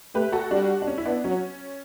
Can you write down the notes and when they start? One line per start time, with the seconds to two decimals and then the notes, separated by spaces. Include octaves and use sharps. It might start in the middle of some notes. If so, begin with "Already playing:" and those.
0.14 A3 G4 B4
0.32 F#4 A4
0.51 G3 D4 F#4
0.82 D4
0.87 C#4
0.98 E4
1.05 B3 D4
1.24 F#3 C#4